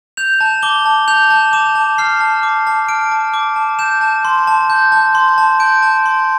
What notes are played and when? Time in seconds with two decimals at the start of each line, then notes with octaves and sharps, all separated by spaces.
0.17 G6 F7
0.41 A5
0.62 D6 G7
0.86 A5
1.08 G6 F7
1.30 A5
1.53 D6 E7
1.75 A5
1.98 F6 C7
2.21 A5
2.43 D6
2.67 A5
2.89 F6 D7
3.12 A5
3.34 D6
3.56 A5
3.79 G6 E7
4.01 A5
4.25 C6
4.47 A5
4.70 G6
4.92 A5
5.15 C6
5.38 A5
5.60 G6 D7
5.82 A5
6.06 C6